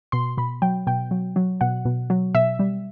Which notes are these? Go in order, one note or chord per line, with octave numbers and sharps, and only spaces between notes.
B2 C6
B2 B5
F#3 G5
B2 G5
F#3
F#3
B2 F#5
B2
F#3
B2 E5
G3